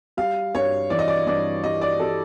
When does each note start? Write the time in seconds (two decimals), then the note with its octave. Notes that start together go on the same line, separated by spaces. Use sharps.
0.17 G3 F5
0.55 G2 C#5
0.90 E3 D5
0.99 D#5
1.08 D5
1.27 G2 D5
1.64 G3 D#5
1.82 D5
2.00 G3 A4